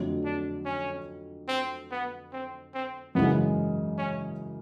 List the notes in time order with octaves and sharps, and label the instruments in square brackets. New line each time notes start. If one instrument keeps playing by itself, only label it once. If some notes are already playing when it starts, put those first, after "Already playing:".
Already playing: [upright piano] F2 D3 F#3 A3
[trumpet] D4
C#4
C4
B3
C4
C4
[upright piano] F#2 C#3 E3 G#3 [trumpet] B3
[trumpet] C#4